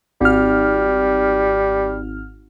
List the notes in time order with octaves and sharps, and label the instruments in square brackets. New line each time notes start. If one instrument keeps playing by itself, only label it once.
[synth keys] G#1 F6 [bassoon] G3